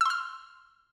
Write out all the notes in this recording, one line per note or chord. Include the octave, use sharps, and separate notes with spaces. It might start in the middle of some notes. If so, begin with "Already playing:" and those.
C6 E6 F6